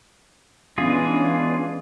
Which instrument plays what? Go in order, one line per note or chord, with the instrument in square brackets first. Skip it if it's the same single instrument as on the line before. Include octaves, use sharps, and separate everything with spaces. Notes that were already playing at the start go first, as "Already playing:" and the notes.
[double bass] E3 [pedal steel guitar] G#3 F4 G#4 [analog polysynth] B3 C#4 D4